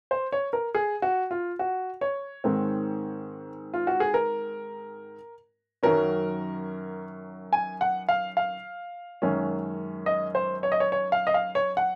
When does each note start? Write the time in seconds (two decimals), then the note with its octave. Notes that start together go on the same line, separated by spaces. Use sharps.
0.11 C5
0.32 C#5
0.53 A#4
0.75 G#4
1.02 F#4
1.31 F4
1.59 F#4
2.01 C#5
2.44 G#2 D#3 G#3 C4
3.74 F4
3.87 F#4
4.00 G#4
4.14 A#4
5.83 F#2 D#3 F#3 C#4 A#4
7.53 G#5
7.81 F#5
8.09 F5
8.37 F5
9.22 F#2 D#3 G#3 C#4
10.06 D#5
10.35 C5
10.63 C#5
10.72 D#5
10.80 C#5
10.92 C#5
11.12 F5
11.27 D#5
11.34 F5
11.55 C#5
11.77 F#5